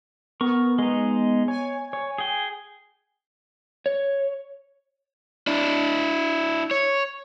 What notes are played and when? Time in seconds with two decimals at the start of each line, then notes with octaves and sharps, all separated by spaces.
0.41 B3 A#4 C#6
0.79 G#3 D#4
1.48 C#5 G#5
1.93 C#5
2.18 G#4 G5
3.86 C#5
5.47 D4 E4
6.71 C#5